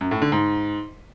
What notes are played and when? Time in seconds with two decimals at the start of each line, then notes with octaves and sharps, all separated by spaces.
0.01 F#2
0.11 A2
0.22 D3
0.32 G#2